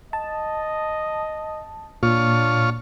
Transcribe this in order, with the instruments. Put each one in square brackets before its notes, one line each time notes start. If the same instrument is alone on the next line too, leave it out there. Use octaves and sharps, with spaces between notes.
[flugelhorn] D#5 [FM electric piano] A5
[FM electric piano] A#2 [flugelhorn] D4 [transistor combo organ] F4 C#5